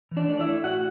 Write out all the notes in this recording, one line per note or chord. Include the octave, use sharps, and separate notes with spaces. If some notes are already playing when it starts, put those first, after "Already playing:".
E3
D4 D5
A3 D5
E4 E5
A3
A2 F#4 F#5